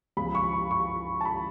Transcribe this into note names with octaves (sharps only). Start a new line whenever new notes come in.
C#2 C#3 F3 B5
C#6
B5
C#6
A5
B5